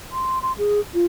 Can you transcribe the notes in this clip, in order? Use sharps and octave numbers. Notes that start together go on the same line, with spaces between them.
C6
C6
G#4
F4